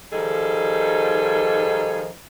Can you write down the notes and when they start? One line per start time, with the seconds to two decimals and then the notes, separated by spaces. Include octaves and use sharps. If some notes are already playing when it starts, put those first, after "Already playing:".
0.12 D#3 F3 G3 D#4 G#4 A4